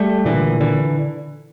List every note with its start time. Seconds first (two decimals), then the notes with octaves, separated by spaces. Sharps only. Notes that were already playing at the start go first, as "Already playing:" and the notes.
Already playing: G3 A3
0.25 A#2 D3 E3
0.61 D3 E3